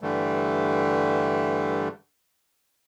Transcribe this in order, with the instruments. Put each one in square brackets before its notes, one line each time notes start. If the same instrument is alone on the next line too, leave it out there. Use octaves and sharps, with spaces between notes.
[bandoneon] G2 D3 E3 G3 A3